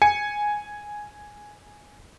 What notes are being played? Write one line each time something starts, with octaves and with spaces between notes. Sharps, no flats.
G#5 C#7